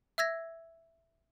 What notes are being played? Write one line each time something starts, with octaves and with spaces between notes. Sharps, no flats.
E5 E6 G#6 A#6